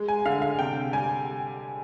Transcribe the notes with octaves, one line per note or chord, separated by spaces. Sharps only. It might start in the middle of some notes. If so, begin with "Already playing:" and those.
Already playing: G#3
G#5
D3 F5
F5
C3 G5
G3 G#5